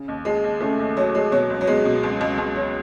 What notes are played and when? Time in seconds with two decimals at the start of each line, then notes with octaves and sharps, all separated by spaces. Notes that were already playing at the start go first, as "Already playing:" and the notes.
Already playing: C#3
0.08 D#2
0.25 D#2 G#3
0.44 D#2
0.61 C#3 A3
0.79 D#2
0.97 D#2 F#3
1.14 F#3 G#3
1.32 B2 F#3
1.50 C#2
1.61 F#3
1.67 B2 G#3
1.85 B2
2.04 C#2
2.21 C#2
2.38 C#2
2.56 F#3